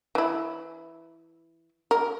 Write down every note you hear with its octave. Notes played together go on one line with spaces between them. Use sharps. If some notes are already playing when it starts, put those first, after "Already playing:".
E3 E4
A#4